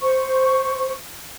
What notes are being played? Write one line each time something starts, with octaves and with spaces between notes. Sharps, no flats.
C5 C#6